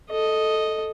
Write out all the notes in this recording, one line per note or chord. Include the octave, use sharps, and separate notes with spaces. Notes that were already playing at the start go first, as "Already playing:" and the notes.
A4 D#5